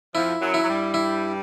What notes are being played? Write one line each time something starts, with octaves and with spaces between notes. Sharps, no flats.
F2 F3 E4
F#2 F#3
E4
F#3
G2 G3
E4